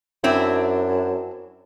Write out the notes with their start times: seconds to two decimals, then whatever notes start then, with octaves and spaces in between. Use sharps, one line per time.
0.24 F#2 C4 D4 E4